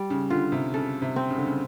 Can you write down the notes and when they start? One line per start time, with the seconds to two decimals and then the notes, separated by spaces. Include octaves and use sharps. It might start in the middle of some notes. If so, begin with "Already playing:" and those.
Already playing: G3
0.10 C#3
0.30 D3 F4
0.52 C3
0.74 C#3 A4
1.02 C3
1.16 C4
1.30 C#3
1.38 D3
1.47 C#3